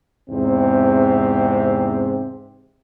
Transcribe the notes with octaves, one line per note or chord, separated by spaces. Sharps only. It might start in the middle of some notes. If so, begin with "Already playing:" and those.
E2 G#2 C3 C4